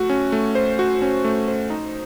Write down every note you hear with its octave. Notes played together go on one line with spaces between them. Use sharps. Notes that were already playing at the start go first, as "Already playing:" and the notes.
Already playing: A3 F#4
C#4
A3
C5
F#4
C#4
A3
C5
D#4